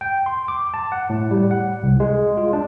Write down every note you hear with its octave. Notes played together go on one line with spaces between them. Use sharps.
G5
C6
D6
A5
F#5
A2
G3
F#5
C2
G#3
F4
D4